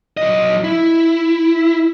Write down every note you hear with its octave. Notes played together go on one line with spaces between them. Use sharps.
F#3 D#5
E4